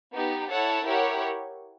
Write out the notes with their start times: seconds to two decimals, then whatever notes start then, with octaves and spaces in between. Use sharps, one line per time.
0.12 B3 D#4 G4
0.49 E4 A4 C#5 F#5 A5
0.85 E4 G4 A#4 C#5 F#5